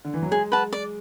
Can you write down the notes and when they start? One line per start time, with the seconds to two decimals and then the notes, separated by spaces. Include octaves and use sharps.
0.04 D3
0.14 E3
0.22 F#3
0.31 G#3 G#4
0.52 B4 F#5 A5
0.73 D5